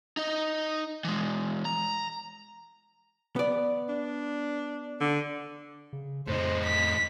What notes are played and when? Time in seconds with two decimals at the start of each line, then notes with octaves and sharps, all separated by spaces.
0.17 D#4 D#5
1.04 E3 G#3
1.65 A#5
3.36 B3 D5
3.89 D4
5.00 D3
5.93 C#3
6.27 F2 A2 D#4 C5
6.65 B6